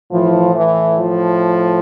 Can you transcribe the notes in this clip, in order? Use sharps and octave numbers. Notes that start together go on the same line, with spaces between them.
A2 E3 F3
E3
F3